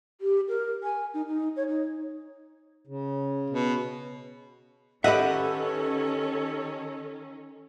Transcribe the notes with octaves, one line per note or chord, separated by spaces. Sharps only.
G4
A#4
G#5
D#4
D#4
C#5
D#4
C#3
B2
D#3 C#4 G4 A4 B4 D#5 E5 F#5